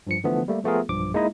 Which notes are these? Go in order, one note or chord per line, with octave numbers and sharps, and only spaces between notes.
G2 F3 C#7
D3 E3 F3 A3 B3
G3 A3 A#3
F3 A3 B3 F4 G#4 A#4
B1 G2 F3 D6
G#3 A#3 D#4 E4 D#5